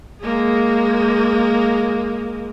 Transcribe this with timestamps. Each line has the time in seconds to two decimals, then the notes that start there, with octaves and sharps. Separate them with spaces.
0.22 G#3 A#3